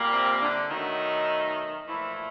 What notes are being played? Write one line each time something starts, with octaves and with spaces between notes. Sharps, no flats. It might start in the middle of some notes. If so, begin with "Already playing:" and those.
Already playing: A#2 G3 A#3
C3 C4
D3 D4
B2 D#3 F#3 A3 D#4
A#2 E3 F3 A3 E4